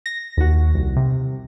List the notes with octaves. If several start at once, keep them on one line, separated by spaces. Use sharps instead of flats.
A#6
D#2 F#4
C2
C3